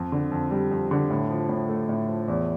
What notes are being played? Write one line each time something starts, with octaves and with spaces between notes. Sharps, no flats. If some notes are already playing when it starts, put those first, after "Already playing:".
Already playing: F2
D3
F2
G3
F2
D3
A2
F3
A2
A3
A2
F3
E2